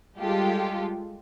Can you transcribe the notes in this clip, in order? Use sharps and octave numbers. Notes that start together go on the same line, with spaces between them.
G3 G#3 F4 G4 A4